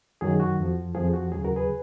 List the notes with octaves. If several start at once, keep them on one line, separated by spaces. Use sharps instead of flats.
F#2 D#3 F#3 G#4
F#4
F2 F3
F2 F3 G#4
F#4
D#2 C#3 F#3 G#4
F#4 A#4
G#4 B4